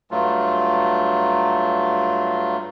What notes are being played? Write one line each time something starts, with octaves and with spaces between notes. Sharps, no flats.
G2 F#3 A3 F4